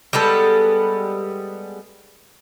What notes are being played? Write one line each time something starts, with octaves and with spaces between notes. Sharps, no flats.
G3 G#3 B3 A4